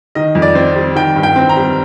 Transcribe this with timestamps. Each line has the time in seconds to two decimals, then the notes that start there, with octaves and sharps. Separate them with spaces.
0.15 D#3 D#5
0.35 F2
0.42 D5
0.55 C4
0.76 G3
0.95 D#3 G5
1.16 G2
1.23 G5
1.36 C4
1.49 A#5
1.57 G3